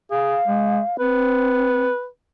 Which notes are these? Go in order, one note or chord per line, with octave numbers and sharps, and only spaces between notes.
G#4 F5
G#3
C4 B4